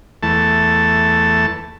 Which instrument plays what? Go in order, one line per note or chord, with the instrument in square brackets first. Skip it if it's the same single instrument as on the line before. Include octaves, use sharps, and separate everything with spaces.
[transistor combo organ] E2 A3 A5